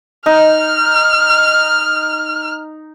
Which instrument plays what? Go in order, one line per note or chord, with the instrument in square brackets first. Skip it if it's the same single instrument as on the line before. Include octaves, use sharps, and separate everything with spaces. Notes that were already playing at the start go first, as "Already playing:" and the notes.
[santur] D#4 [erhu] F6